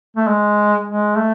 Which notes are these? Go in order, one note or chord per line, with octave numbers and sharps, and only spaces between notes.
A3
G#3
G#3
A3